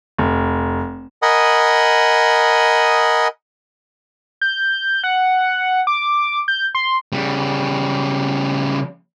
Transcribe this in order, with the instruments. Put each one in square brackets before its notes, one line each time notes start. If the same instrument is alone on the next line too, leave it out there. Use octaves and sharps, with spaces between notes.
[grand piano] F1
[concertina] A#4 D#5 F#5 G#5 B5 D#6
[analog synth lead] G6
F#5
D6
G6
C6
[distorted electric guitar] C#3 G3